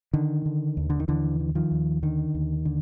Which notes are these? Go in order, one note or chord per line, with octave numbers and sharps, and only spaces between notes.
D3 D#3
D3
D#2
D3
D#3
D#2 D3 E3
D3
D#3 F3
D#2
D3 D#3
D#2
D3